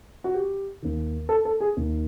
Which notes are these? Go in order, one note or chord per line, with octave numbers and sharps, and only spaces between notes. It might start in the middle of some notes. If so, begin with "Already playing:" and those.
F#4
G4
D#2 D#3
A4
A4
G#4
D#2 D#3